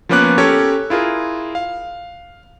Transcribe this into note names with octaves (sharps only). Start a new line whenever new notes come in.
F3 A#3 B3 C#4 D6 F#6
C#4 G4 A4 A#4 C#5
E4 F4 G#4 A#4
F5